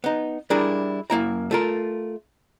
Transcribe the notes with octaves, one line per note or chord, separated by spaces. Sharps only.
B3 D#4
G3 D4 E4 G#4 A#4
F#2 A#3 E4 A#5
A3 F4 A#4